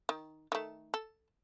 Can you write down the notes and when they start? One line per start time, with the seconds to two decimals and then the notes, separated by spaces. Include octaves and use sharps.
0.09 D#3
0.52 D#3 A3
0.94 A4